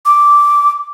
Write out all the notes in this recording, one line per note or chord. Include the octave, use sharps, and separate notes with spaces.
D6